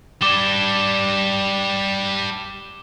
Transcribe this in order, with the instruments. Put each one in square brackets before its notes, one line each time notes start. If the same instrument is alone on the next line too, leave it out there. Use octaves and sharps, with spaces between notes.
[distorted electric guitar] G3 D4 [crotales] D6 E7 G7